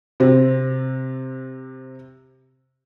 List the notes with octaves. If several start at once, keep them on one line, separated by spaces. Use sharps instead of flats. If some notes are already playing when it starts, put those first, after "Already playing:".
C3 C4